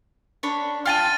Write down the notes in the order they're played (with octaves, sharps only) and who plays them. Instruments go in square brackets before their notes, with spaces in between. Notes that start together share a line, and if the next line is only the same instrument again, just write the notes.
[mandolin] D4 C#5 B5
[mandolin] F4 G5 A5 [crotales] F6 A6 D#7
[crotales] F6 A6